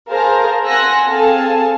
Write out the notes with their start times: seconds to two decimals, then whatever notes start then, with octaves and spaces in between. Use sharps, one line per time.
0.10 G#4 A#4 C5 F5 A5 A#5
0.66 F#5 G#5 C6 E6 F#6 A#6
1.06 C4 G#4 A4 F5 A5